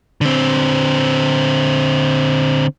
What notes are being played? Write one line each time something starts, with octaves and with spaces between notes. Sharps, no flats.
D3 C4